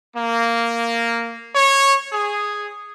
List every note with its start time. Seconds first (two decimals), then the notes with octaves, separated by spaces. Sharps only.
0.17 A#3
1.53 C#5
2.13 G#4